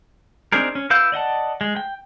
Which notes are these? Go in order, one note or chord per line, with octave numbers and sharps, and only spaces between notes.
C4 D4 D#4 G#4 A#4
C#4
E4 B4 F5 E6 G6
D5 D#5 F#5 A5
G#3
G5